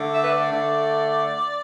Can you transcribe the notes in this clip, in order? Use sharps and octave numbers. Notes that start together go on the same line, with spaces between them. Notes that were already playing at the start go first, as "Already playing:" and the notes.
Already playing: D3 A3
E5
B4
D5
D3 A3